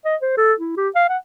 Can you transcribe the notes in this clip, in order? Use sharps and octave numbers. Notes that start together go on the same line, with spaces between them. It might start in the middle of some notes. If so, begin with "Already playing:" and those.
D#5
C5
A4
E4
G4
F5
F#5